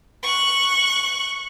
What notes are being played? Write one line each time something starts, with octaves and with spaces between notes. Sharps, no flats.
C#6 F#6